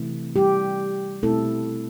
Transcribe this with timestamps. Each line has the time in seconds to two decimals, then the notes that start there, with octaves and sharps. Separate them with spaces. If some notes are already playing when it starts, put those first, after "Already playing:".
Already playing: C3 E3 A3 C4 E4
0.36 G3 G4
1.23 B2 A3 C4 E4 A4